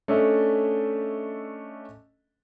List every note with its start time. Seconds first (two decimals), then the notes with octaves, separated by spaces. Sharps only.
0.08 A3 C#4 D4 A4 D#5 E5